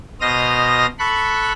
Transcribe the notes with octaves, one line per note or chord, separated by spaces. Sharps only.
B2 C5 D#5 D#6 F6 A#6
A4 B5 C#6 F#6